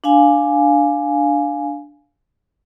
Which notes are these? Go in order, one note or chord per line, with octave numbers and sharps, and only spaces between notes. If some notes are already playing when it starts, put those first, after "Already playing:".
D4 F5 G#5